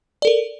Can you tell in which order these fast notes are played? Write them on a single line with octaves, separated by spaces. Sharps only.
D5 A4 A#4